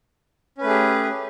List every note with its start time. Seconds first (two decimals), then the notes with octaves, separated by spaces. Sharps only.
0.58 C#4
0.61 B4
0.64 A3
0.67 G#4
0.70 G4